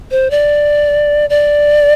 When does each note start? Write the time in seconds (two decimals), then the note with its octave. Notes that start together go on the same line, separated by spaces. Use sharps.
0.11 C5
0.31 D5
1.30 D5